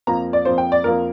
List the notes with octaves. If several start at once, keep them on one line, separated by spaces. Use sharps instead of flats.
F2 F3 A#3 A#5
D5
F2 F3 A#3 C5
G5
D5
F2 F3 A#3 A#4